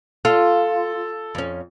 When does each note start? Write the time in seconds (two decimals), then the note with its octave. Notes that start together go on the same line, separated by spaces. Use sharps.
0.25 F4 A4
1.35 F2 C#4